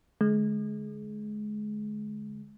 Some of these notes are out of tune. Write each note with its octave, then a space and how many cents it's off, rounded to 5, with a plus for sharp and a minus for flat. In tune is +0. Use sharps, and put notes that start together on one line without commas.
D3 -10 G#3 +25